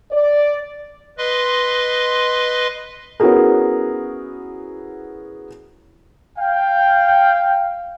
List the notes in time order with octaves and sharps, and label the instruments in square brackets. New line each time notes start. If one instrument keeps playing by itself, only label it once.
[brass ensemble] D5
[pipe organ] B4 D#5 C6
[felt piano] B3 C#4 E4 F#4 G#4 A#4
[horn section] F5 G5